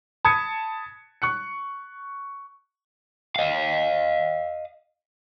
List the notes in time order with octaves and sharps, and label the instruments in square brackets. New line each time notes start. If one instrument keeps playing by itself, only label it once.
[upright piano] A5 B5 D#6 G#6 C#7
C#6 F#6 C#7
[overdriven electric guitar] D#5 F5